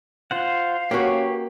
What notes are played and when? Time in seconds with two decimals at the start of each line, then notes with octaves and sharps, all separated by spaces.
0.31 F4 C5 F5 F#5
0.91 A#3 C#4 F#4 G4 B4 C#5